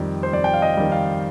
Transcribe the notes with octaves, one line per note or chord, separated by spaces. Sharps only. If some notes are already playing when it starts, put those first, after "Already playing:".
Already playing: F2 D#3 G3 D5
C5
F2 D5
G5
F5
D#5
D#3 G3
F5